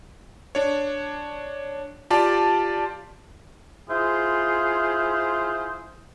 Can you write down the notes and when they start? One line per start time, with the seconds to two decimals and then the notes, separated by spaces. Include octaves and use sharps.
0.55 D4 C#5
2.10 F4 G4 D5 A5
3.89 E4 F4 G#4 C5